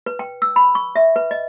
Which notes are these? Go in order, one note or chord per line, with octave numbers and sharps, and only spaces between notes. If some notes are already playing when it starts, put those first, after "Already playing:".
B4
G5
E6
B5
C#6
E5
B4
D#5